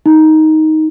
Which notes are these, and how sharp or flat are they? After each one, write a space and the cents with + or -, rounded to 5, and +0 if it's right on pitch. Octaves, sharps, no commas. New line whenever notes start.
D#4 +10